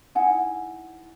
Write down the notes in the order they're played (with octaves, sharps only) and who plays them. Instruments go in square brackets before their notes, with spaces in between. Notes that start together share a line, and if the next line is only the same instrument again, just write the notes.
[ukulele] D#4 E4 F#5 G#5